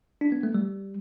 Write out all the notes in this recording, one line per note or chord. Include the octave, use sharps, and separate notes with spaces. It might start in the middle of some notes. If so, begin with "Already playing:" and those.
D4
B3
A3
G3